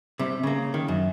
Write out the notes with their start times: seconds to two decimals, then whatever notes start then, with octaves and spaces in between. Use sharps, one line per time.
0.19 C3 G3
0.43 C#3 A#3
0.74 D#3
0.88 F#2